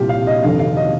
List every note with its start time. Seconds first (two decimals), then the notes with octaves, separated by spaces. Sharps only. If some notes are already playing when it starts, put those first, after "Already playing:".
Already playing: C2 A#2 F3 F4 G4
0.09 F5
0.27 D#5
0.43 F1 D#2 D3 F5
0.60 F5
0.77 D#5